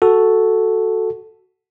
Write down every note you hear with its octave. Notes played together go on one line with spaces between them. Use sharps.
F#4 A4